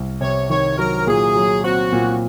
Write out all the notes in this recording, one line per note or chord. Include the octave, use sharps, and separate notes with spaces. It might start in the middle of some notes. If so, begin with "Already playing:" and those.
Already playing: C2
C3 C#5
D#3 C#5
F#3 A#4
A#2 G#4
F#3
C4 F#4
A#2